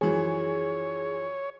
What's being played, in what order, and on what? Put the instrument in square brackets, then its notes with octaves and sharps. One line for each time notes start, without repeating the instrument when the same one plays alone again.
[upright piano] F#2 E3 F3 [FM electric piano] G#4 [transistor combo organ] C#5